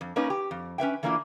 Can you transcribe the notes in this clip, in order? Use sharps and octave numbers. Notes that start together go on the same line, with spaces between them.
F2
A#3 C#4 D#4 B4 D#5
G4
F2
C#4 B4 E5 G5
E3 A3 A#3 D4 E4 F4